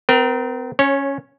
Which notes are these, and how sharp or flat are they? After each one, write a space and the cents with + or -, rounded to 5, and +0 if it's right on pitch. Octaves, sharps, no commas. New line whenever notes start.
C4 -40 A#4 +15
C#4 +0 C#5 -20